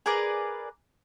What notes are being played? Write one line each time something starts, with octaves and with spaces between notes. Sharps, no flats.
G#4 A#4 B4 D5